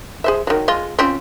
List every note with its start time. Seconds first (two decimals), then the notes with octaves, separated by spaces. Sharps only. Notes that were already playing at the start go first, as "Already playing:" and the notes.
0.24 G#4 C5 E5
0.47 D#3 F#3
0.68 G#3 F4
0.99 C4 C#4 F4